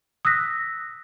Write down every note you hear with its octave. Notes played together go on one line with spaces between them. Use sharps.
D#6 E6 F#6 A#6 B6